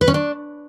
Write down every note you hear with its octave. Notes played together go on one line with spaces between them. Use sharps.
B4
C#4
D4